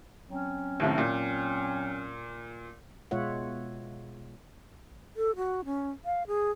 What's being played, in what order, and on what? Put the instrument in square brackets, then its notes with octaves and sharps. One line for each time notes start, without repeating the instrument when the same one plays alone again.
[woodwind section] F#3 C4 C#4
[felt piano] D#2 A2 C3
A#2
[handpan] B2 G#3 F4 C#5 E5 F#5
[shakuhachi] A4
F#4
C#4
F5
G#4